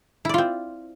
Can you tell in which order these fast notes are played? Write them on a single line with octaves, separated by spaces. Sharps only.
E4 D5 F4 C4